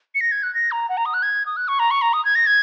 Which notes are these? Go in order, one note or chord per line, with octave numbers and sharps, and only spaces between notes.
C#7
A#6
G#6
F#6
A#6
A#5
F#5
A#5
D#6
F#6
G#6
D#6
F#6
C#6
A#5
C#6
A#5
D#6
G#6
A#6
G#6